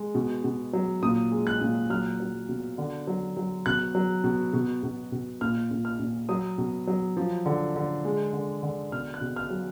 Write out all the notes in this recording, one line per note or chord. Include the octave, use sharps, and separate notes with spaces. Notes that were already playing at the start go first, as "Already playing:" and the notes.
Already playing: G#3
B2
B2
F#3
A#2 D#6
G#3
F#6
A#2
F#3 F6
F#3
B2
D3
F#3
F#3
B2 F#6
F#3
B2
B2
B2
B2
A#2 F6
A#2
F6
A#2
F#3 D#6
B2
F#3
F3
D3
D3
G#3
D3
D3
B2 F6
F#6
B2
F6
F#3